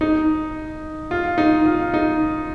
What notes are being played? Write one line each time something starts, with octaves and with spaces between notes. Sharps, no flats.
D#4
F4
D#4
F4
D#4